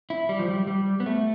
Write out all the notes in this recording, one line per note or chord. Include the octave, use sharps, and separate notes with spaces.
E4
G3
F3
G3
G3
B3
A3